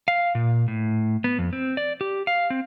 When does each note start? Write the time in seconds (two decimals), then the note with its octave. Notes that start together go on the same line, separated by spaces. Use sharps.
0.08 F5
0.35 A#2
0.68 A2
1.24 B3
1.39 F2
1.53 C4
1.77 D5
2.01 G4
2.27 F5
2.50 C4